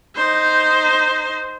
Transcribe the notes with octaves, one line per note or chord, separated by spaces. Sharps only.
D#4 C5